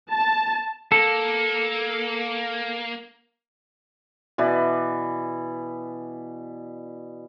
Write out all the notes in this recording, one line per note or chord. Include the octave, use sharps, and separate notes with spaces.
A5
A#3 A4
B2 E3 B4 D5